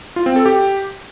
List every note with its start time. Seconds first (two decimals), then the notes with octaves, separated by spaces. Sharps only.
0.16 F4
0.26 C4
0.36 A4
0.46 G4